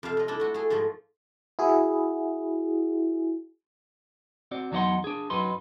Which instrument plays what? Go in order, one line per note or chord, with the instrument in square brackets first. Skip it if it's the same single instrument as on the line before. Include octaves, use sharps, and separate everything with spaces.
[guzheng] F2 C3 E5 F5 A5
F2 D#5
D4 E4 A4
A3 F#4
A3 G#4
G#2 F3 G#3 A3
[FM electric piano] E4 F#4 G#4
[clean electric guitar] C4 F#4 D5
E2 F#3 D#4 D5 F#5 C6
D4 G#4
F#2 F#3 D#4 B4 C6